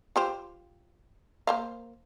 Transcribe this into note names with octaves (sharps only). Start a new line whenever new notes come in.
F4 G4 C5
A#3 C5 F5